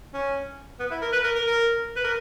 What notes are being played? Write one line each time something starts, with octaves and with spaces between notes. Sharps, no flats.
C#4
B3
E4
A#4
B4
A#4
A#4
A#4
B4
A#4